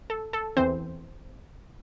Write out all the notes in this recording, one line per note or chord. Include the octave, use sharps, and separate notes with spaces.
A4
A4
E2 E3 C4 C5